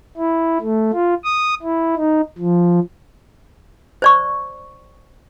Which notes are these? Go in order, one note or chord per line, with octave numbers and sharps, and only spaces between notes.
E4
A3
F4
D#6
E4
D#4
F3
C5 D5 C#6